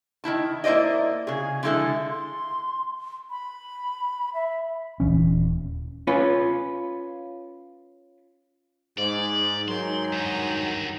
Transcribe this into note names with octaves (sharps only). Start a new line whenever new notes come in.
D#3 D#4 E4 A5
A#3 E4 C5 D5 D#5
C#3 G#4
D3 F3 G#3 E4 G#4 A4
C6
B5
E5
D#1 A#2 E3 C#4
C#4 F4 B4
G#2 D5
G#2 D#3 F#3 C6
G2 D#4